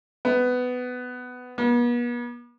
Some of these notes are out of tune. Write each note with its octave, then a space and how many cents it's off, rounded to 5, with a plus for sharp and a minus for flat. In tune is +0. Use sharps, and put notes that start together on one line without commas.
B3 +15
B3 -40